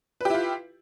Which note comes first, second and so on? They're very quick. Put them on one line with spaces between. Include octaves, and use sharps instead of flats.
B4 G4 E4 F4